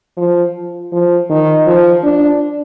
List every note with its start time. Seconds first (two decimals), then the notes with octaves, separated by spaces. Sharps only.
0.17 F3
0.92 F3
1.29 D#3
1.66 F3
2.04 D4